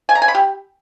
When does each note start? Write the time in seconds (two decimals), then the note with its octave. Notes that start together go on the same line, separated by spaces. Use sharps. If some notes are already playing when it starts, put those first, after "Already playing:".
0.09 G#5
0.15 A#5
0.22 G#5
0.28 B5
0.35 G4